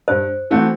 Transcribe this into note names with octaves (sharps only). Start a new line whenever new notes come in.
G2 C5
E3 A3 C4 F#4